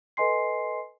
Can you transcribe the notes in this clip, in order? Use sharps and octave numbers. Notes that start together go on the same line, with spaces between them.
A4 B4 D#5 G#5 C6 C7